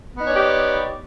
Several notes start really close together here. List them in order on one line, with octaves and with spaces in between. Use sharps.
B3 D#4 C#5 D5 G4